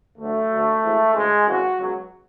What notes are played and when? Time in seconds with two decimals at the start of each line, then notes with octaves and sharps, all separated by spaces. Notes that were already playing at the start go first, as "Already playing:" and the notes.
0.18 D2 D3 F#3 A3
0.51 D2 D3 F#3
0.82 G#1 G#2 E3
1.14 D2 C#3 E3 G#3
1.46 G#1 F#2 C#3 E3 F#4
1.78 C#2 B2 F#3